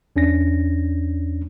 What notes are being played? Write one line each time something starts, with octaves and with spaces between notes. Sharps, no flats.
E2 C#4 D4 A#6